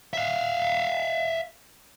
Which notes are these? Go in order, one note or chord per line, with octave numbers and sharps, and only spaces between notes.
E5 F5